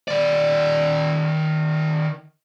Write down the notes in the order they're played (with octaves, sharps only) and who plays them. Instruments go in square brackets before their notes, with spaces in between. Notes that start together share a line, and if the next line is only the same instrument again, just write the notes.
[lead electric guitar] D#3 D5